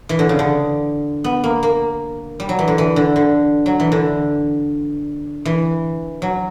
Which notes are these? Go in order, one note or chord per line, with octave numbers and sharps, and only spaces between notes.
E3
D3
C#3
D3
B3
A#3
A#3
G3
F#3
E3
D3
E3
D3
D3
F#3
E3
D3
E3
F#3